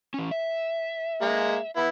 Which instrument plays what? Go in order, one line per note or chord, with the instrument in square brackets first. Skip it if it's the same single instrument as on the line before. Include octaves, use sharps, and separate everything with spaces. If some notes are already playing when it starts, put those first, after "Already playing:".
[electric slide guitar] E3 C#4
E5
[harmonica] G#3 A#3
B3 E4